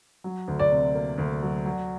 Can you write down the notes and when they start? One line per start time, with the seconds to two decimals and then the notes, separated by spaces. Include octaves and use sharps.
0.24 F#3
0.48 D2
0.60 D5
0.71 C3
0.95 A#3
1.18 D2
1.43 F#3
1.66 F#3